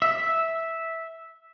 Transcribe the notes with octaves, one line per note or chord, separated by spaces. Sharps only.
E5